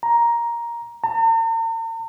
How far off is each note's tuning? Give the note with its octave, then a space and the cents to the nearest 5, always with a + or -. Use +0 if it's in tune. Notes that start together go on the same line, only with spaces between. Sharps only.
A#5 +10
A#5 -45